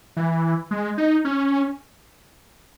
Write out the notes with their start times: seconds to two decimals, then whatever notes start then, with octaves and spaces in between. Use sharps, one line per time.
0.17 E3
0.71 G#3
0.98 D#4
1.25 C#4